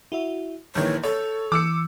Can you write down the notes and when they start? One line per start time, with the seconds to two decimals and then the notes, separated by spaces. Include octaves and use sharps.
0.12 E4 F#4 E5
0.75 A#1 D#3 E3 C#5 G6
1.04 A4 C#5
1.52 E3 D6 E6 C#7